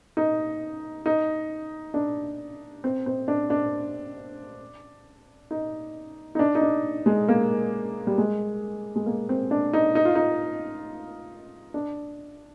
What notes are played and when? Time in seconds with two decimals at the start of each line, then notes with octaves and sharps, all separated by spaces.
0.17 D#4
1.06 D#4
1.94 D4
2.84 C4
3.06 C4
3.28 D4
3.50 D4
5.51 D#4
6.35 D#4
6.39 D4
6.55 D#4
6.61 D4
7.06 G#3
7.29 A#3
8.07 G3
8.18 G#3
8.96 G#3
9.06 A#3
9.29 C4
9.51 D4
9.73 D#4
9.95 D#4
10.05 F4
10.15 D#4
11.74 D4